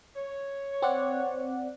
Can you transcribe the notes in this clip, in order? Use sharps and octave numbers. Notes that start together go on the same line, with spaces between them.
C#5
C4 D5 F#5